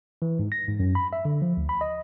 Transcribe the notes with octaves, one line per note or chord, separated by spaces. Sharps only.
E3
G#2
A#6
G#2
F#2
B5
E5
D3
F3
D2
B5
D#5